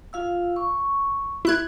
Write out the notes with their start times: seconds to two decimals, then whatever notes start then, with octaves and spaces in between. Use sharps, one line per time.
0.13 F4 F5 E6
0.56 C#6
1.45 E4 F#6 G#6